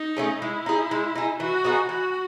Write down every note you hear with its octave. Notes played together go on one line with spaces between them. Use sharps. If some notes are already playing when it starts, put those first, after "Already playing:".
Already playing: D#4
A3 C#4 G#4
G#3 E4
D#4 G#4
G#3
D#4 G#4
E3 F#4
B3 D#4 G#4
E3 F#4